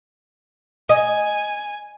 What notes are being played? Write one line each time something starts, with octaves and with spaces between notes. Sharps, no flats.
D#5 G#5